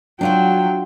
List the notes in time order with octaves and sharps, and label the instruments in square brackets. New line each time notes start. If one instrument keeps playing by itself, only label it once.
[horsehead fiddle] F#3 [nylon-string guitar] D4 F4 F#4 [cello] G5